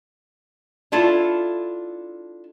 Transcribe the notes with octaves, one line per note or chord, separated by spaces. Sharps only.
D4 E4 F4 A4